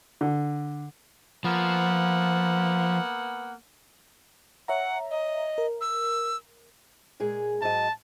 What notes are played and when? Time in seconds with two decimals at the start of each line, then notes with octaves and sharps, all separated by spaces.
0.21 D3
1.44 F3 A#3 B3 F#5
4.68 C#5 E5 F#5 A#5
5.11 D#5
5.58 A#4
5.81 E6
7.20 A#2 G#3 G#4
7.62 G#2 F#3 D#5 A5